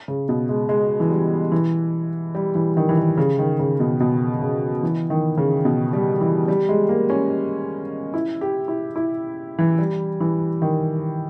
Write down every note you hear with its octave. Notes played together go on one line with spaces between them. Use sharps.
C#3
B2
G#3
G#3
E3
G3
E3
G3
E3
D#3
E3
D#3
C#3
D#3
C#3
B2
B2
C#3
E3
D#3
C#3
B2
G3
E3
G3
G#3
A#3
C#4
E4
G4
E4
E4
E3
G3
E3
D#3